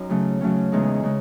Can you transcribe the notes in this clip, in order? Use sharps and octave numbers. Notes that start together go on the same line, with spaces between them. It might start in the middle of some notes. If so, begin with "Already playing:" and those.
Already playing: F#2 D#4
C#3 F#3 A3 C#4
C#3 F#3 A3 C#4
E2 C#3 G#3 D#4
C#3 G#3